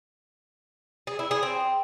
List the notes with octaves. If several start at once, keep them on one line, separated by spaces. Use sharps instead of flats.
G#4
E4
G#4
C4